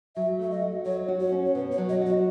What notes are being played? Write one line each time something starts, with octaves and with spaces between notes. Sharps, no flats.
F#3 E5
A3 E5
D#5
F#4
F#3 C#5
F#4
C#5
C#4
C#5
B2 B4
C#5
F#3
D#5
F#4 D#5